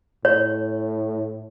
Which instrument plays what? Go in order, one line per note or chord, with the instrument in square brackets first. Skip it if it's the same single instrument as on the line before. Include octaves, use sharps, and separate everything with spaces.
[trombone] A2 [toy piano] C#5